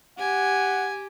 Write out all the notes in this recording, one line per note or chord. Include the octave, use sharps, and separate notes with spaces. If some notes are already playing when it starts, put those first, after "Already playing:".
G4 F#5 G#5